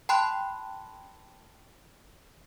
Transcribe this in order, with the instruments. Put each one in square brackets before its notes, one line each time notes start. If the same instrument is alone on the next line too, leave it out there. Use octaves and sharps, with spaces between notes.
[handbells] G5 A5 B5 C6 F#6